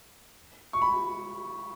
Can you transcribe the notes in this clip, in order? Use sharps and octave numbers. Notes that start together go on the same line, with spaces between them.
C#6
B5